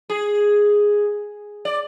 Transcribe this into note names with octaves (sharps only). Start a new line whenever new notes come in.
G#4
D5